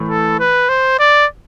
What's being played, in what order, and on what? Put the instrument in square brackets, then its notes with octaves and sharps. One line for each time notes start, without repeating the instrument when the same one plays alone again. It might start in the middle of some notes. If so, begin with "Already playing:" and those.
Already playing: [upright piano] A2 E3 A3
[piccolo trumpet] A4
B4
C5
D5